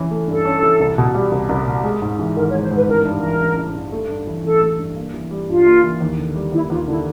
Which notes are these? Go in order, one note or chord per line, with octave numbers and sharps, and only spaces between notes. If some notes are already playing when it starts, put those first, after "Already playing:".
Already playing: E3 C#4
A3
G2 A4
C#4
E3
C2
B2
G3
C2
C2
B2
G#3
G#2
E3
G#1 A#4
C#5
G#3
C5
G#2 B4
A1 A#4
G2
A#4
E3
A1
A1
G2
A3
G2
E3
A1 A4
A3
G2
A#3
E3
G3
G2 F4
A#3
E3
D#2
D3
G3
D#2 E4
D#2 F4
D3 E4